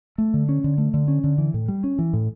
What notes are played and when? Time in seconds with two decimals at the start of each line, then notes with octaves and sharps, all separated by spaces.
0.18 A3
0.34 D3
0.49 C#4
0.64 D3
0.78 A3
0.94 D3
1.08 C#4
1.24 D3
1.38 E3
1.54 A2
1.68 G3
1.84 C#4
1.99 E3
2.13 A2